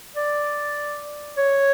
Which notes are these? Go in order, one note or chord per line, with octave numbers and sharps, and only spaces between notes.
D5
C#5